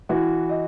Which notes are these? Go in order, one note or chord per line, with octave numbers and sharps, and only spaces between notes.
E3 F#4
D#5